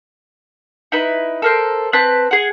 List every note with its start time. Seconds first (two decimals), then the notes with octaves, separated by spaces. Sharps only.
0.92 D#4 E4 B4
1.42 A4 A#4 C5
1.93 C4 B4 A5 F#6
2.31 G#4 F#5